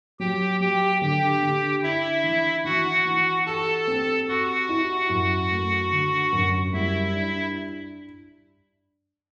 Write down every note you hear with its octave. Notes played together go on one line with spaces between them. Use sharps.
F#3 G4 G5
F#3 G4 G5
D3 G4 G5
D3
D4 E4 E5
E3
E3 F#4 F#5
E3
G4 A4 A5
C4
F#4 G4 F#5
E4
F#2
A3
D3
F#2
G3 E4 E5
D4